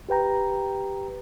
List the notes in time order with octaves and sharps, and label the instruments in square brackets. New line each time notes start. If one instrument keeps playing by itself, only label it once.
[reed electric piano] G4 B4 G5 A#5